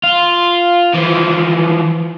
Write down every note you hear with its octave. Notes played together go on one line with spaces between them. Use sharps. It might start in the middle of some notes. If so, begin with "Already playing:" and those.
F4
E3 F3